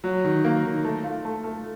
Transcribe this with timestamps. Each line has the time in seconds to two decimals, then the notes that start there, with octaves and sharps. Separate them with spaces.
0.04 F#3
0.25 D#3
0.45 A#3
0.64 D#3
0.85 A3
1.04 F4
1.25 A3
1.44 A3